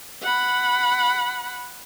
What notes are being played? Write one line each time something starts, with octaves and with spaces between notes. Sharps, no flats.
F#5 B5